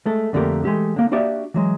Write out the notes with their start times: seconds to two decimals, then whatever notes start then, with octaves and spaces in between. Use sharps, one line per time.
0.06 G#3 A3 A4
0.33 F2 D3 A3 A#3 G4 A#4
0.64 E3 G#3 A3 G4 A4
0.96 D3 A#3
1.11 A#3 D4 F#4 G4 D5 E5
1.54 E3 F#3 G#3